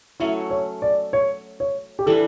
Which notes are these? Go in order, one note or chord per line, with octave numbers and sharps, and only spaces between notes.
F#3 A3 C#4 E4
C#5
D5
C#5
C#5
G4
E3 G3 D4 A4